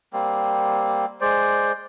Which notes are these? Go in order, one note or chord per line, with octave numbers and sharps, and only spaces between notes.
G3 A#3 C4
G#3 C5 D5